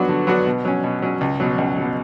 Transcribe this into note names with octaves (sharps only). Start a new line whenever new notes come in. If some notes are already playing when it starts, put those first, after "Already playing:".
Already playing: F#3 B3 D4 F#4
D3
F#3 B3 D4 F#4
B2
F#3 C#4
B2
F#3 C#4
C#2
B2 F#3
C#2
B2 F#3